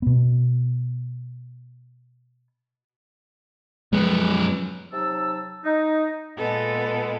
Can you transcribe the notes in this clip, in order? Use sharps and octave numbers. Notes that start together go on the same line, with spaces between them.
B2 B3
F#2 F3 G#3 B3
C3 F#3 D#4 A5 E6
D#4
A#2 G#3 B3 A4